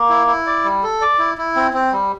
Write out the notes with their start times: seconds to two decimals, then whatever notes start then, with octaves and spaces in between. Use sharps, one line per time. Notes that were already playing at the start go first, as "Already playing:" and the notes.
Already playing: A#3
0.09 E4
0.27 E4
0.47 D5
0.64 G3
0.83 A4
1.01 D5
1.19 E4
1.38 E4
1.56 C4
1.74 C4
1.92 G3